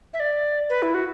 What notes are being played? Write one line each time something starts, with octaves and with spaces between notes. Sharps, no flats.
E5
D5
B4
E4
F#4